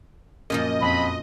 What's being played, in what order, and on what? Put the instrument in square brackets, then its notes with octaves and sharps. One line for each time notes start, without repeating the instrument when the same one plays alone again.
[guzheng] F#2 A#2 F3 [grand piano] A#3 [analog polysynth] D#5
[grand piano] F2 [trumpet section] B5